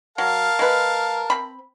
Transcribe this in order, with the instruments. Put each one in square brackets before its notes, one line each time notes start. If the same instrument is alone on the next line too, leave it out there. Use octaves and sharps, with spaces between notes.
[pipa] F#3 [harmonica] A#4 F5 A5
[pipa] G#3 B4
C4 B5